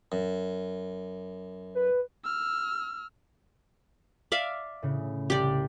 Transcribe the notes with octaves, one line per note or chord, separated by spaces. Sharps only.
F#2
B4
E6 F6
D5 E5 F5
A2 C#3
C2 G4 D5